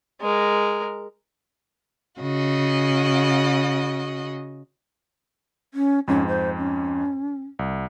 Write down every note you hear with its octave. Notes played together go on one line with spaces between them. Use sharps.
G#3 A#4
C#3 F#4 D#5
C#4
F2 G#2 C#4
C5
C#4
C2